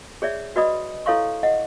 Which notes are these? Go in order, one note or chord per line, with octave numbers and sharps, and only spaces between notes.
G#4 C#5 D5 E5
F#4 B4 D5 D#5 B5 D#6
E4 A4 C#5 F5 C6 C#6
D#5 F#5